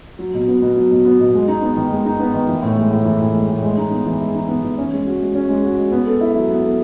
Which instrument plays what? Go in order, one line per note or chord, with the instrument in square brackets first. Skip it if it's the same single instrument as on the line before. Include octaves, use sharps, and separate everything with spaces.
[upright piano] F#3
B2
B3
B2
F#3
B2
B3
B2
G#3
D#4
B3
D#3
G#3
D#4
B3
D#3
E3
A2
G#3
A2
E3
A2
G#3
A2
G#3
D#4
B3
E3
G#3
D#4
B3
E3
C#4
G#3
F#4
G#3
C#4
G#3
F#4
G#3
B3
A4
E4
F#3
B3
A4